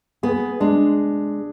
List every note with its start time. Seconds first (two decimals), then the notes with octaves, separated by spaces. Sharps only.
0.23 B3 G#4
0.60 G#3 D4